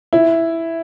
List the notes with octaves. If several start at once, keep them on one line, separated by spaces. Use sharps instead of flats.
E4